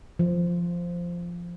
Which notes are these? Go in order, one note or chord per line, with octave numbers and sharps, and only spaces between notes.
F3